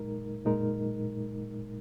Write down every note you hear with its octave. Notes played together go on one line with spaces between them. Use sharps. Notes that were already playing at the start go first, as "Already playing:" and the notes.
Already playing: A#2 G#3 D#4 A#4
A#2 G#3 D#4 A#4